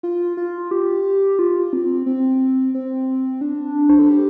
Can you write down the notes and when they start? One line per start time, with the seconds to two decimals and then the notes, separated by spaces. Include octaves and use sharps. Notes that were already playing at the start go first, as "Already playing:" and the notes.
0.03 F4
0.37 F4
0.71 G4
1.39 F4
1.73 C4
2.06 C4
2.74 C4
3.41 D4
3.90 C5
3.99 A4
4.09 G4